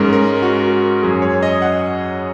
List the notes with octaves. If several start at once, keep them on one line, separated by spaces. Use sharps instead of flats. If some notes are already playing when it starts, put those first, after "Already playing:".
Already playing: G#2 G#3 C#4 A#4
A#4
F#4
A#4
F#2 F#3 C#4 G#4
C#5
D#5
F#5